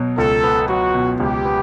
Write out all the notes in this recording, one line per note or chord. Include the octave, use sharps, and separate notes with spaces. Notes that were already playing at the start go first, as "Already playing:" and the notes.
Already playing: B2 F#3
C#2 A4
B3
F#3 F#4
B2
C#2 G4
B3